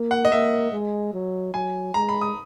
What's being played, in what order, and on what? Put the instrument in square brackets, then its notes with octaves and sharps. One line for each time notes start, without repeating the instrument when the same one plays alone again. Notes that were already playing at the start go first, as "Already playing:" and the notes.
Already playing: [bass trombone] A#3
[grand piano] F#5
D#5
[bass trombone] A#3 [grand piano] E5
[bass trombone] G#3
F#3
[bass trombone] F#3 [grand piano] G#5
[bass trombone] G#3 [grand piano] A#5
[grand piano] B5
D#6